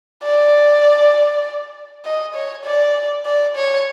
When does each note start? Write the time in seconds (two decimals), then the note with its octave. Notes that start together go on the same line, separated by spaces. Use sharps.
0.23 D5
2.05 D#5
2.35 C#5
2.65 D5
3.25 D5
3.56 C#5